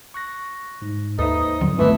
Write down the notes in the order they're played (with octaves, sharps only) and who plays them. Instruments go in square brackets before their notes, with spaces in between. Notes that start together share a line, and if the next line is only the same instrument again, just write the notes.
[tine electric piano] C#6 F#6 A#6
G#2
[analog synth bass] D#2 [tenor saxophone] D#4 [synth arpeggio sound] A4 E5 [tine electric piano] B4 C5
[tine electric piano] G#2 F3 [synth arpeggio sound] D3 F#3 C4
[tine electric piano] G#1 B3 A5 [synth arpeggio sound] G2 C4 [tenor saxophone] E3 [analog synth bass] A3